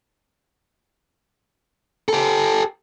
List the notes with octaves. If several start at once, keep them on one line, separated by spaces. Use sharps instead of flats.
G4 A4